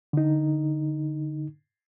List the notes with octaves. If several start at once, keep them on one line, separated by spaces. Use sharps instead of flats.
D3 D#4